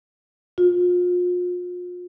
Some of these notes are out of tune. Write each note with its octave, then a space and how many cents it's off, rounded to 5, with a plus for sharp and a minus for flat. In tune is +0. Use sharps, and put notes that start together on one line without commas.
F4 +35